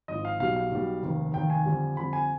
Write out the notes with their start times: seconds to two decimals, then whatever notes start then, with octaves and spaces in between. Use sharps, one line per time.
0.08 G#1 G#2 F3 D#5
0.25 F5
0.40 B1 B2 G3 F5
0.56 F5
0.71 B1 B2 G3
1.03 F1 D#2 D#3
1.34 F1 D#2 D#3 G5
1.50 G#5
1.66 F2 D3 G3
1.97 F2 D3 G3 B5
2.13 G#5